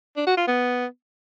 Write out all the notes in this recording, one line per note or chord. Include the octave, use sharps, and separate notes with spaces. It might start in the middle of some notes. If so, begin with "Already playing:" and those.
D4
F#4
F4
B3